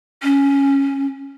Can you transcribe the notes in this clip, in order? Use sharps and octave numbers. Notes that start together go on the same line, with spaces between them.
C#4